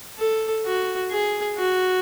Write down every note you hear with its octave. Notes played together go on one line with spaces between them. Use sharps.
A4
F#4
G#4
F#4